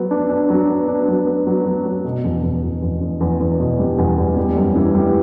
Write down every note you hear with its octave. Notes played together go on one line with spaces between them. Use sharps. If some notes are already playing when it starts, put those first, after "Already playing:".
Already playing: F#3 B3
D4
D4
F#3
B3
D4
F#3
B3
F#3
F#3
F#3
B2
E2
E2
E2
E2
E2
E2
E2
B2
G3
E2
E2
G3
F#2
E3
G3